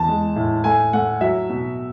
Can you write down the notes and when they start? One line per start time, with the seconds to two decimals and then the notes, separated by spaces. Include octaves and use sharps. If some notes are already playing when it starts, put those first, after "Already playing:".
Already playing: E2 A5
0.08 G#3
0.36 A2
0.64 A3 G#5
0.93 A3 F#5
1.21 F#3 E5
1.50 B2